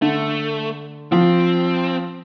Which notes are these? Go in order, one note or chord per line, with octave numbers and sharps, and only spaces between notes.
D3 A3
F3 C4